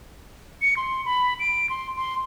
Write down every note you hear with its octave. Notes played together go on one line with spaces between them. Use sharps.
C#7
C6
B5
D7
C6
C6